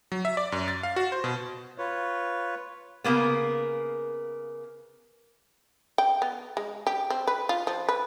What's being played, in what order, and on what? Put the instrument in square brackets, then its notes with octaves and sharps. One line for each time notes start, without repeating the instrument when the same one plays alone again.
[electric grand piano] F#3
E5
D5
F#2
A6
F5
F#4
C5
B2
[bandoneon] F4 B4 C#5
[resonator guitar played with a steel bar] C#3 A#3 B3
[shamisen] G5
B3
G#3
G4
C4
B4
F4
F3
B4